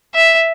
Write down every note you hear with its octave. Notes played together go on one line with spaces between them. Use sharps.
E5